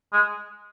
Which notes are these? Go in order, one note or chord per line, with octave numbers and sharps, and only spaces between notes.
G#3